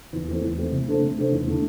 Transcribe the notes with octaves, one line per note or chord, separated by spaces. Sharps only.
E2
E3 A3 C4
E2
E3 A3 C4
C3
A3 D4 A4 C5
C3
A3 D4 A4 C5
E2
D3 A3 D4